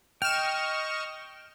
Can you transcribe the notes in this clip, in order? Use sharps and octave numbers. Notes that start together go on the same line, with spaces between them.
D#5 G5 C#6 F6 E7